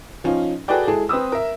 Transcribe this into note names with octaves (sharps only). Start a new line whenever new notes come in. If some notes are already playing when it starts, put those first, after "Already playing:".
F3 C#4 D#4 F4
F#4 G#4 A4 B4 D5 G5
G#3 E4 G#4 A4
C4 B4 D#6 E6
A#4 E5